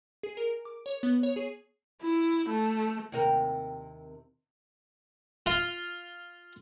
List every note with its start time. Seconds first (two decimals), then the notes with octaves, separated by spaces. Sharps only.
0.23 G#4
0.37 A#4
0.65 D6
0.86 C#5
1.03 B3
1.23 C#5
1.36 G#4
2.02 E4
2.49 A3
3.12 D#2 C3 A#4
5.46 F4